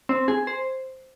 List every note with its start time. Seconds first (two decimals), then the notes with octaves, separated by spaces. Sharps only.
0.09 C4
0.28 G#4
0.47 C5